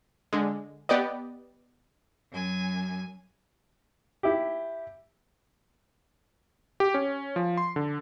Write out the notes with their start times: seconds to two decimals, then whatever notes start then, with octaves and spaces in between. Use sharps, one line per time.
0.33 D3 G#3
0.89 B3 G4 B4 D5 D#5
2.32 F#2 G#5
4.23 E4 G4
6.80 G4
6.94 C#4
7.36 F3
7.57 C6
7.76 D3